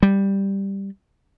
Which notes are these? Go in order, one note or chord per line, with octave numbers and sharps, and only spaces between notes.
G3